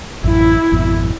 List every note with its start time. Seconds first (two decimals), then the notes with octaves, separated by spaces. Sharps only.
0.24 A1 F#2 E3 E4
0.72 G#1 F2 B2